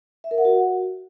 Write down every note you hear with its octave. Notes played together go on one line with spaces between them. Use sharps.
E5
A#4
F#5
F#4